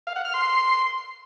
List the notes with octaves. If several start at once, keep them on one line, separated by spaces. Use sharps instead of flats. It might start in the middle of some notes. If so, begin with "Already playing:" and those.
F5
F#5
F6
C6